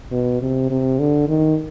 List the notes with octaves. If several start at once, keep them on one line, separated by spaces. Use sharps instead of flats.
B2
C3
C3
D3
D#3